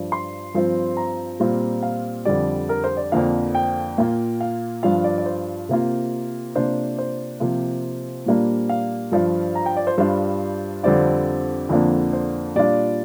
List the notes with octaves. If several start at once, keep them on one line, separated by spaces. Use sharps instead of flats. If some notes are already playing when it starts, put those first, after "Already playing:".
Already playing: G2 F3 D4
C6
G2 F3 C4 F4
A#5
A#2 G3 C4 F4
F5
F2 D3 G3 D5
A#4
C5
D5
F2 D3 F3 A#3 D4 F5
G5
A#2 A#3 F4
F5
G2 F3 D4 F4 F5
D5
D5
C5
C3 A#3 F4
C3 A#3 D4 F4 C5
C5
C3 F3 A#3 F4
A#2 G3 A#3 D4 F4
F5
G2 F3 D4 F4
A#5
G5
D5
C5
G2 G3 D4 F4 C5
F2 D3 G3 C4 F4 D5
F2 D3 F3 A#3 D4
C5
A#2 G3 D4 F4 D5